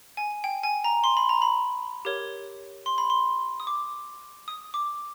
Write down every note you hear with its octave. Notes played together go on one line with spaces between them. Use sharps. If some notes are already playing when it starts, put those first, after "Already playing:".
G#5
G5
G#5
A#5
C6
B5
A#5
B5
G4 A#4 C#5
C6
B5
C6
D#6
D6
D#6
D6